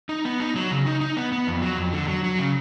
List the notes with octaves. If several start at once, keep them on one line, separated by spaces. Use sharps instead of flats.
D#4
B3
D#4
F#3
C#3
D#4
D#4
B3
B3
F2
F#3
F2
D3
F#3
F#3
C#3